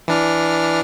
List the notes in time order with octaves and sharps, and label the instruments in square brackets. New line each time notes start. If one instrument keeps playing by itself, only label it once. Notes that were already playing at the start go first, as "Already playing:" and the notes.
[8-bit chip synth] E3 D4 F6